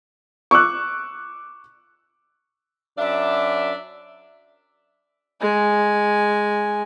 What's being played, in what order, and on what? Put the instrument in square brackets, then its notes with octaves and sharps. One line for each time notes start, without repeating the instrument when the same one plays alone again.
[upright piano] C#6 D6 E6 F#6
[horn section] F#2 D4 D5 E5
[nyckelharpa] G#3 G#5